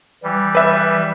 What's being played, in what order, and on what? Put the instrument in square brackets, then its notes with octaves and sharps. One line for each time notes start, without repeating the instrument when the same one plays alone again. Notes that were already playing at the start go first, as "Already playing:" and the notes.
[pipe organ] E3 G3
[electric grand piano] B4 E5